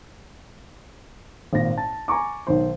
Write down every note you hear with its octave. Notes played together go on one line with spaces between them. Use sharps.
G#1 A#2 A#6
A5 A6
G#5 A#5 C#6 D6
B1 D#3 C5